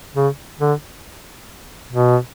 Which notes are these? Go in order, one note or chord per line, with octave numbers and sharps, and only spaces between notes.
C#3
D3
B2